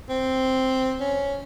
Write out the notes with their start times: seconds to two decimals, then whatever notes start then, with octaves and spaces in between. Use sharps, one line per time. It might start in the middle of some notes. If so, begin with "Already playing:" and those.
0.09 C4
1.00 C#4